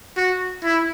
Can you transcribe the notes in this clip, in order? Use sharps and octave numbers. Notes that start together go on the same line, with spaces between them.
F#4
E4